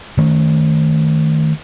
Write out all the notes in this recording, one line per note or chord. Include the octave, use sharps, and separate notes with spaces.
D#3 A3 C#4